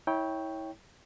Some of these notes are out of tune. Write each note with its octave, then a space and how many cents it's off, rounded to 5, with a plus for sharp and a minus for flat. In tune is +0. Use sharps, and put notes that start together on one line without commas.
E4 -30 C#5 +0 G5 +0